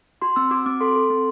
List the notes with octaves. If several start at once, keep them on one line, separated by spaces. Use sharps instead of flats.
F#4 C6
C4 E6
F#4 D6
C4 D6
A4 C6
A4
C4